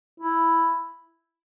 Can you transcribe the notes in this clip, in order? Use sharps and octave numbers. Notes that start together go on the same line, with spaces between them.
E4